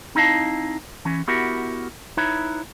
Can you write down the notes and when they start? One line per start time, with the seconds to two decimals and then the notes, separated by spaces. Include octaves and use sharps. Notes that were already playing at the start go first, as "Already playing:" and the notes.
0.15 C4 D#4 E4 D#5 F5 A5
1.05 E3 C#4
1.28 B3 E4 F#4 G4 A#4 F#5
2.17 D#4 E4 B4 C#5